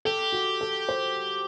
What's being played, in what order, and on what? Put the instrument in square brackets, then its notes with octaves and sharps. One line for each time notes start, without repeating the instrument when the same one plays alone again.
[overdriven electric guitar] G4 [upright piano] A4
[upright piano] F#4
A4
C5